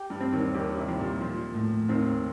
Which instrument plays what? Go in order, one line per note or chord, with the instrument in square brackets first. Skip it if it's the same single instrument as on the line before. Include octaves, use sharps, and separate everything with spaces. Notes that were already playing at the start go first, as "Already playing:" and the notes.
Already playing: [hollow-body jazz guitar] G4
[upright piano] G2 G3
[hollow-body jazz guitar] C4
[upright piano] D#2 D#3
[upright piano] D#2 D#3 [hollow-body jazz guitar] G4
[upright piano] C2 C3
[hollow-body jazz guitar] F3
[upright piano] A#2
[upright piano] A#2 [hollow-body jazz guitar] F3
[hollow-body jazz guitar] A2
[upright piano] D#2 D#3 [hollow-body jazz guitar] C4